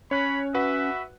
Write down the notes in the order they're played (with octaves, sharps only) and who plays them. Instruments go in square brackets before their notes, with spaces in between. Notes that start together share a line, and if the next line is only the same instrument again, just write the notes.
[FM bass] C#4 [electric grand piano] C#5 F#6 [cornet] B5
[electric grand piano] F#4 B4 F#5 [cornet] E5